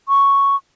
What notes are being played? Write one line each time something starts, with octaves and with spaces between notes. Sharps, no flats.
C#6